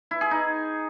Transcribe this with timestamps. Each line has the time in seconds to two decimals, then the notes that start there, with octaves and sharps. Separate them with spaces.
0.11 E4
0.21 G#4
0.31 D#4